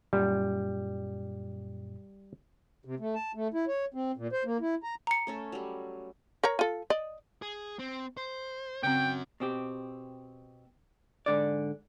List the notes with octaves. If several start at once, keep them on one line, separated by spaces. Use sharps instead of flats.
F#2 A#2 G3
C3
A3
A5
A3
E4
C#5
C4
A#2
C5
A#3
E4
A#5
A#5 C#7
A3 C#4 A4
F#3 G3
A#4 C#5 A#5
F4 A4
D5 D#5
G#4
C4
C5
C#3 C4 C#4 F#4 G5
B2 C4 G4
G#2 D3 D5